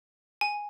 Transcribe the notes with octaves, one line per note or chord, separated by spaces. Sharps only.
G#5